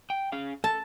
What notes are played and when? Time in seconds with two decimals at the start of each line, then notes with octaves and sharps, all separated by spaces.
0.10 G5
0.32 C#4 G#4 F5
0.64 A4 A5